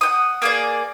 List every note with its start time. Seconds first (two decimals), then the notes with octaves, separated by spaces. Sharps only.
0.01 F#5 G5 D#6
0.42 A#3 G#4 D5